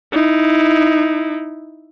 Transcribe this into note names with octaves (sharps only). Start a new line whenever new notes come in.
D#4 E4